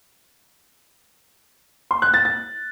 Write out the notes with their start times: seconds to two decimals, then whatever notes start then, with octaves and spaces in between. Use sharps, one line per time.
1.91 C6
2.02 F#6
2.14 A6
2.25 A6